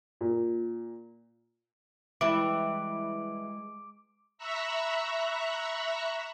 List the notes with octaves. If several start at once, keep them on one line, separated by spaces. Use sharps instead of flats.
A#2
E3 G3 G#3 E4 D6 D7
E5 A#5 B5 C#6 E6 F#6